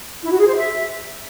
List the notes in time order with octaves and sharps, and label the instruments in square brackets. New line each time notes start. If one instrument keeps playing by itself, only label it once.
[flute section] E4
F#4
G#4
C5
E5